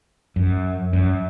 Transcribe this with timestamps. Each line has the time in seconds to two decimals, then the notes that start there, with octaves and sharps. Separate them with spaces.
0.36 F#2
0.93 F#2